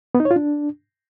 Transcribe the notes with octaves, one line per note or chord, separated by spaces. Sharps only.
B3
D#4
C#5
F4
D4